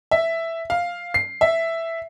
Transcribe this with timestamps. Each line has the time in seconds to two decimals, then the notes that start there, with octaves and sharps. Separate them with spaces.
0.11 E5
0.70 F5
1.14 C7
1.41 E5